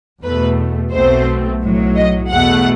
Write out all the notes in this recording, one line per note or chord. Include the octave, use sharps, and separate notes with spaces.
E2 B2 A3 B4
B1 B2 A3 C4 C5
B1 A2 F#3
D#5
E2 B2 A3 F#5